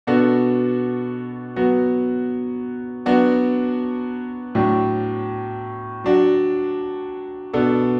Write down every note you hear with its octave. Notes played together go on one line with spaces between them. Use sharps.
B2 B3 D4 F#4 A4
F#3 B3 F#4
F#3 B3 D4 F#4
A2 F#3 D4
F#3 D4 F#4
B2 B3 D4 A4